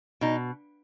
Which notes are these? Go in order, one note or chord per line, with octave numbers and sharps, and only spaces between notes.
B2 D#4